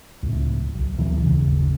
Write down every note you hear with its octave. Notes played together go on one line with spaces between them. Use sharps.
C#2 A2
B1
D2 B2 E3 F#3
G1 D#2 C#3